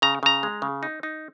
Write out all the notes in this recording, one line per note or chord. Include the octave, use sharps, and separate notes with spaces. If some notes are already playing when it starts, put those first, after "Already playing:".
C#3 A#5
C#3 A#5
G#3
C#3
D#4
D#4